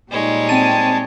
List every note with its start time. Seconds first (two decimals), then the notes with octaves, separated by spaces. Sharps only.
0.11 A#2 G3 G#3 D#4 C#5
0.49 C4 A5 D#7